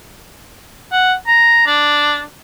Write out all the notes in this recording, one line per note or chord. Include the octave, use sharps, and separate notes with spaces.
F#5
A#5
D4